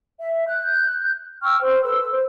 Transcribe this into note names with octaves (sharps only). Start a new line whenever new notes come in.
E5
F#6 G6
G5 C#6 E6 F6
C5
A4 B4 E6
C5